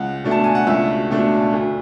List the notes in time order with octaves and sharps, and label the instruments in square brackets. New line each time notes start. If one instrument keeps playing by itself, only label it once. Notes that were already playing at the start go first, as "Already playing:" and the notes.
Already playing: [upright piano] C#2 F#5
B2 A3 D4
A5
G#5
F#5
C#2 E5
B2 A3 D4
D2